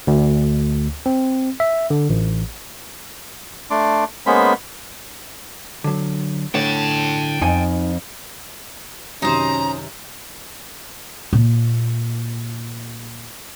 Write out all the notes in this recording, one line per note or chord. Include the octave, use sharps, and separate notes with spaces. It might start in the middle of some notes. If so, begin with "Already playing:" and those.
D2
C4
E5
D3
A1
A3 D4 C6 D6
G#3 A#3 B3 C#4 C5 B5
D3 F#3
A2 D3 C#5 G5 A5
F2 D#4 D#5 G#5
F#2 C3 D#3 C#4 D#4 C5 A#5
A#2 A#3